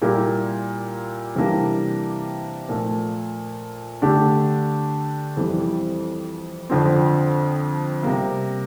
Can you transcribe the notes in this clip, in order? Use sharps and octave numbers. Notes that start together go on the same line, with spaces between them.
A#2 G3 A#3 E4 G4
C3 E3 G3 A#3 D4
A#2 F3 A3
D3 A3 D4 G4
F2 E3 G3 C4
F2 D3 F3 C4
C3 G3 A#3